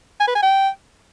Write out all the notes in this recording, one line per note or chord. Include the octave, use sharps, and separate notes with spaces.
G#5
B4
G#5
G5